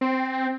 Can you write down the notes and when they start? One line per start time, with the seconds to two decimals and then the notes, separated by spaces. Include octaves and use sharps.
0.01 C4